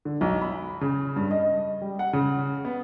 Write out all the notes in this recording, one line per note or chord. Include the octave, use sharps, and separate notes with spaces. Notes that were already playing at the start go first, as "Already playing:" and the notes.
D3
B1
B5
C#3
G2
D#5
G3
F#5
C#3
B3